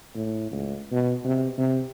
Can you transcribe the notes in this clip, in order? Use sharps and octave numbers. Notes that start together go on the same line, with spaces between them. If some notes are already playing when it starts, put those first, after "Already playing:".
A2
C#2
B2
C3
C3